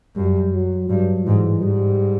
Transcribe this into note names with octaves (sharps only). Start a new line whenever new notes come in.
F#2 G3
F#3
G2 F#3
G#2 E3
G#2 G3